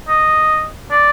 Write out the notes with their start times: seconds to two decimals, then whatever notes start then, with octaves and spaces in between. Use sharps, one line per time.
0.09 D#5
0.91 D5